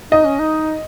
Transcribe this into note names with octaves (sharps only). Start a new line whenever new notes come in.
D#4 D#5
C#4
D#4